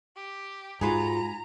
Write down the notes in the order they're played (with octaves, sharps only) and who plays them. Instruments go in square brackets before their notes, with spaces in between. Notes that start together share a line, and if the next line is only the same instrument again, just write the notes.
[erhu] G4
[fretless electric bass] G#2 [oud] F4 F#4 G#4 [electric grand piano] G#5 B5 [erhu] A#5